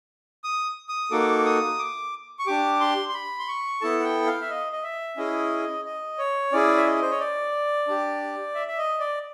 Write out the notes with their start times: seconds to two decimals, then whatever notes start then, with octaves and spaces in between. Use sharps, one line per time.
0.44 D#6
0.89 D#6
1.11 A#3 D#4 F#4 A4 D6
1.46 D#6
1.79 D6
2.39 C#6
2.47 D4 G4 D6
2.80 C6
3.09 C6
3.14 B5
3.39 C6
3.48 C#6
3.81 B3 E4 A4 A5
4.00 F#5
4.04 G5
4.27 F5
4.42 E5
4.50 D#5
4.73 D#5
4.83 E5
5.17 C#4 E4 G#4 D#5
5.85 D#5
6.18 C#5
6.53 C#4 E4 G#4 D5
6.77 E5
6.87 D#5
7.02 C5
7.11 C#5
7.20 D5
7.88 D4 G4
8.55 E5
8.68 E5
8.78 D#5
9.00 D5